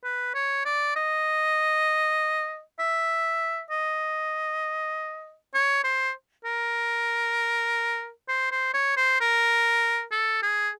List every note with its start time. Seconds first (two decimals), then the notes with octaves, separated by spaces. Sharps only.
0.04 B4
0.34 C#5
0.65 D5
0.96 D#5
2.79 E5
3.70 D#5
5.54 C#5
5.84 C5
6.45 A#4
8.28 C5
8.51 C5
8.74 C#5
8.97 C5
9.21 A#4
10.12 A4
10.42 G#4